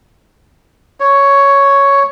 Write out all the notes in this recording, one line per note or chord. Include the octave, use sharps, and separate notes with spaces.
C#5